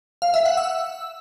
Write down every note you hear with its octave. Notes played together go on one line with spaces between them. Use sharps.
F5
E5
F#5
E6